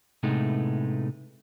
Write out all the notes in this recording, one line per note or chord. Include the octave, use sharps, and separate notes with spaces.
A2 C3 G#3 A3 B3 D#4